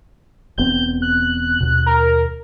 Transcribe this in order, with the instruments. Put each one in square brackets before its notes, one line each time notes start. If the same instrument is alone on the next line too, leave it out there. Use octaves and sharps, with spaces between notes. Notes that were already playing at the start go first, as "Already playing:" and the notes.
[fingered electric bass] E1 B3 C4 [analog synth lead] G6
[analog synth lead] F#6
[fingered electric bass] D#2 B2
[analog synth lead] A#4